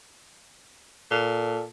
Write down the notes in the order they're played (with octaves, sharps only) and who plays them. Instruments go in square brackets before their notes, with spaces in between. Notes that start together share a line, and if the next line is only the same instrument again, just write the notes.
[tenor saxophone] A#2 [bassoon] A4